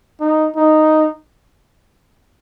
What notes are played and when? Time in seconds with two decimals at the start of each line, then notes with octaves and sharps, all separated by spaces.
0.20 D#4
0.56 D#4